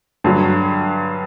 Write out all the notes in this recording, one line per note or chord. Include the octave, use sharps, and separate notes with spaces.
G2 D3 F#3